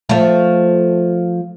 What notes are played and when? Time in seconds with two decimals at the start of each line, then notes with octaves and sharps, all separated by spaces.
0.09 F3 A3